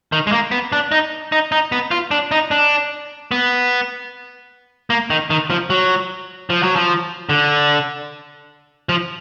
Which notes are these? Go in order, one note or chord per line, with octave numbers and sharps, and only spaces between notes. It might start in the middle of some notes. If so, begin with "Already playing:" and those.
D#3
G#3
A#3
B3
D4
D#4
D#4
D#4
B3
F4
D4
D#4
D4
B3
A#3
D#3
D#3
F3
F#3
F3
F#3
F3
D3
F3